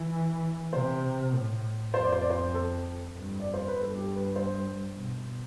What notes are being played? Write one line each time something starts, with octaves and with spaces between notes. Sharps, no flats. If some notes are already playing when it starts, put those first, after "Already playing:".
Already playing: E3
C3 C5
A2
F2 C5
D5
C5
D5
C5
A4
G2
D5
F2
C5
B4
G2
A4
G4
B4
C5
B2